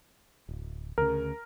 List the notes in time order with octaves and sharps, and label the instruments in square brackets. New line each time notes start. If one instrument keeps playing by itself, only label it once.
[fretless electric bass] D1
[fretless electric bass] D2 C#3 [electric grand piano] A#4